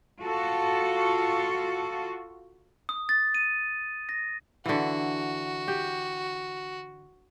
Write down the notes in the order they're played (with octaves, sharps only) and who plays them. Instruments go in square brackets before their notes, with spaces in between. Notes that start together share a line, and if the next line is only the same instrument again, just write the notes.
[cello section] F4 F#4 A4
[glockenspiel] D#6
A6
D#7
A#6
[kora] D3 E3 [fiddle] F#4
[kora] G4